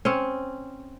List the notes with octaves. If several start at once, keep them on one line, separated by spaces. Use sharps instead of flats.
C4 C#4